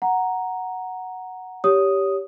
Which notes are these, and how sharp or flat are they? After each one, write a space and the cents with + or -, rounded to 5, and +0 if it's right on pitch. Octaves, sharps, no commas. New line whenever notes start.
F#5 +0 A#5 +0
G4 +0 C#5 +25 D#6 +0